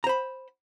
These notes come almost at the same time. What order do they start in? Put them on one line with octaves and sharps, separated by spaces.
A#5 C5 B5